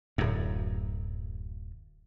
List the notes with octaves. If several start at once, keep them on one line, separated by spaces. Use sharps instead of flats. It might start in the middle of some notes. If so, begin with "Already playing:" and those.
D1 F#2